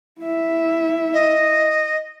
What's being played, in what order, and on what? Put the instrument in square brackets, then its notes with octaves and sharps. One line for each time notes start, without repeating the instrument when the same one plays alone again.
[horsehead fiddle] E4 E5
[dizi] D#5